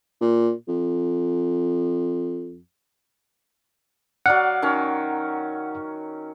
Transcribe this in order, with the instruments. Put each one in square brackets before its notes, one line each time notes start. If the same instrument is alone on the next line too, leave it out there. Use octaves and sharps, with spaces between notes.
[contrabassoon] A#2
F2
[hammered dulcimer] F#3 D5 F5 [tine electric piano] F#5
[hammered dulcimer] D#3 C#4